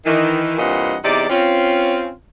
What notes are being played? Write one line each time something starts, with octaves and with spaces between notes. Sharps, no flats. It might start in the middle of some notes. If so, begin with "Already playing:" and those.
D#3 E3
G2 A#2 E3 C4 D#5 F#5
E2 C3 D#4 D5
C4 C#4 F4